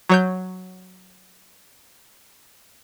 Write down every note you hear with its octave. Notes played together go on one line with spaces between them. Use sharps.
F#3 C#5 G6